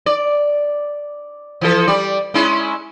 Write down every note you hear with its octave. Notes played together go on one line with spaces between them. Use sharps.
D5
E3 F3 A4
G3 D5
G#3 C#4 E4